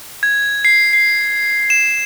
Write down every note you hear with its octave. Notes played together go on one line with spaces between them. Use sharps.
G#6
C7
C7
E7